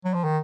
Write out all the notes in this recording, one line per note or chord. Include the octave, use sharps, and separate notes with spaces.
F#3
F3
D#3